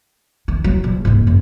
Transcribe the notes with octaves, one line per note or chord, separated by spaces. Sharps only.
D#3
F#3
A#1
G#2 A#3
F#2